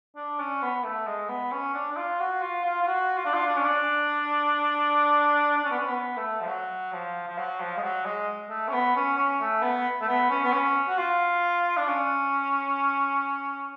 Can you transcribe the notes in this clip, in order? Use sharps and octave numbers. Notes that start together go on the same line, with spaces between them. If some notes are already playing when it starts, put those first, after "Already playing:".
D4
C#4
B3
A3
G#3
B3
C#4
D4
D4
F4
F#4
F4
F4
F4
F#4
F4
D4
F4
D4
C#4
D4
D4
C#4
B3
C#4
B3
A3
F3
F#3
F3
F3
F#3
F3
G#3
F#3
G#3
A3
C#4
B3
C#4
C#4
A3
B3
A3
B3
C#4
B3
C#4
F#4
F4
D4
C#4